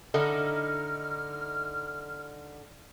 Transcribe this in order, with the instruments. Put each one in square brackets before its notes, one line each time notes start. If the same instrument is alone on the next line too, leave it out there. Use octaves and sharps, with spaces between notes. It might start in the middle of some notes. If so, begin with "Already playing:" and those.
[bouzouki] D3 D#4 E4 [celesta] A4 [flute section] F6